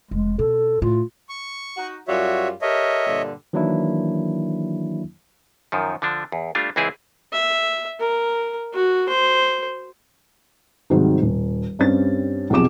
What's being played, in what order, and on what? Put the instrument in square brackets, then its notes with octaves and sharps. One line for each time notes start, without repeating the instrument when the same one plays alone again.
[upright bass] F1 [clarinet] G#3
[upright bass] B2 [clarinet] A4
[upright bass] A2 [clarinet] F4
[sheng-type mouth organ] C#6
[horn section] D#4 F#4
[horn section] F#2 G3 F4 [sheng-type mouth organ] F#4 C#5 E5
[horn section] G4 A4 A#4 [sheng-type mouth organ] C#5 D#5 E5
[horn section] G2 A#2 D3
[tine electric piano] D#3 E3 F#3 A#3 D4 E4
[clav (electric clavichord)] F#2 D#3 F3
D3 F3 D4
E2
G3 A3 D4 F4
C#2 E3 C4 E4 G#4
[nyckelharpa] E5
A#4
F#4
C5
[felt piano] G#2 C3 D#3 F#3 G3
D#1
G2 G3 C4 C#4 A6
B1 F2 C3 G#4 D6 E7